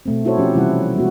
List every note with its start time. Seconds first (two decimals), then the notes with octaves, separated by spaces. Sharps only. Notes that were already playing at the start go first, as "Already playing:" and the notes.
0.06 B2 A3 C4
0.25 D#4 E4 F#4 A4 C5 C#5
0.38 F3 C#4 G4
0.55 C3 E3 G3 E4 F#5
0.96 G#3 B3 F#4